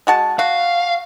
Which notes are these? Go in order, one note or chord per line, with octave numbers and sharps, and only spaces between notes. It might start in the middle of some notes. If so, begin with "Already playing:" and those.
G#3 F#4 A5
F#4 F5